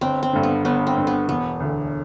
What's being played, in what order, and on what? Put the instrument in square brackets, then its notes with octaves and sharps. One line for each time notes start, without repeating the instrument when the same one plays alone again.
[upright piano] G1 [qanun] C4
[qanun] C4
[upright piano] G2 D3
[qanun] B3
[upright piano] G1 [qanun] B3
[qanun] C4
[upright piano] G2 D3
[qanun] B3
[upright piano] E1 [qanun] B3
[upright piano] D2 D3